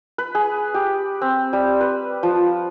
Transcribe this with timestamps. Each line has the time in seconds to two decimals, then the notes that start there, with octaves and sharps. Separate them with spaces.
0.18 B4
0.35 G#4
0.74 G4
1.22 C4
1.53 G3
1.81 B4
2.23 F3